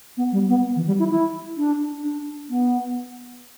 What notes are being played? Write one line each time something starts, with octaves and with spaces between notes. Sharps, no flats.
B3
G3
B3
E3
G3
E4
E4
D4
D4
B3